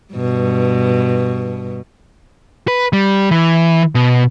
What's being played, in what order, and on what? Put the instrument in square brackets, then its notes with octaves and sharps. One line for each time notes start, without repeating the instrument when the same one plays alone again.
[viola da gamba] G2 B2
[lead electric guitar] B4
G3
E3
B2